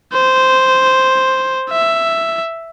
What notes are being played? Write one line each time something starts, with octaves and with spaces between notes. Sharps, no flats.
C5
E5